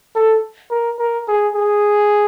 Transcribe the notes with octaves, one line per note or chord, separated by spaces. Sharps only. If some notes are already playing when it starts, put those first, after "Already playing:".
A4
A#4
A#4
G#4
G#4